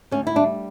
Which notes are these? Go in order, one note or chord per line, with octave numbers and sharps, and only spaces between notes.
D2 C#4
E4
G3 D4